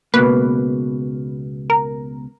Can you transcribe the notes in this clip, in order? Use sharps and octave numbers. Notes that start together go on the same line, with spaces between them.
C#2 B2 A#3 B4
A#4